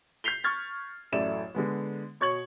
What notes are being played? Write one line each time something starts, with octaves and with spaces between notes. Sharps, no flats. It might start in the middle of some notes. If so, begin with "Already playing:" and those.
G6 B6 C7 F7 G7
C#6 F6 G#6 A6
A1 F#2 A3 E4 D5 E7
D3 G#3 B3
B2 C#5 C#6 G#6 F#7